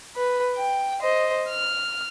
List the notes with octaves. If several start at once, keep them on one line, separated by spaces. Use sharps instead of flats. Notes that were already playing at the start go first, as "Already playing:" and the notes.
B4
G5
C5 D#5
F6